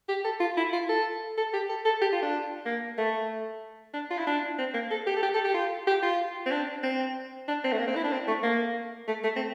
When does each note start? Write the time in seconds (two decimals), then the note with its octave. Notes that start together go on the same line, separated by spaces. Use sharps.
0.09 G4
0.25 A4
0.40 F4
0.57 E4
0.73 F4
0.89 A4
1.38 A4
1.54 G4
1.69 A4
1.85 A4
2.01 G4
2.12 F4
2.22 D4
2.66 A#3
2.98 A3
3.94 D4
4.11 F4
4.18 E4
4.27 D4
4.58 C4
4.74 A#3
4.90 A4
5.07 G4
5.16 A4
5.23 G4
5.34 A4
5.44 G4
5.54 F4
5.87 G4
6.03 F4
6.46 C4
6.51 D4
6.83 C4
7.48 D4
7.64 C4
7.72 A3
7.79 A#3
7.88 C4
7.95 E4
8.04 D4
8.12 C4
8.27 A3
8.43 A#3
9.08 A3
9.23 A3
9.36 C4